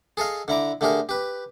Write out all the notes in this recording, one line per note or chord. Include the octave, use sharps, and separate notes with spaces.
G#4 A4 D#5 F5
D3 E4 A#5 D6
D3 A3 G4 G#4 A#4
G4 B4